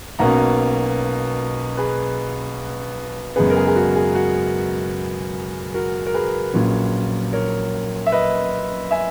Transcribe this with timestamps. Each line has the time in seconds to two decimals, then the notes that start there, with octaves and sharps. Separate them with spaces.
0.19 B1 B2 A#3 C#4 F#5 A#5
1.77 G#4 B4
3.36 F#2 C#3 G#3 B3 G#4 B4
3.50 A#4
3.56 G#4
3.67 G#4
3.76 F#4
3.95 G#4
4.15 F#4
5.74 F#4 A#4
6.07 A#4
6.14 G#4 B4
6.53 A#1 A#2 F#3 C#4
7.33 A#4 C#5
8.07 E5
8.12 B4 D#5
8.91 E5 G#5